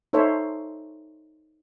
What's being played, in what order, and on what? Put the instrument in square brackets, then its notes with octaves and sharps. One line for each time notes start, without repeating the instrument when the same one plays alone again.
[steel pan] D#4 A4 C5 C#5 E5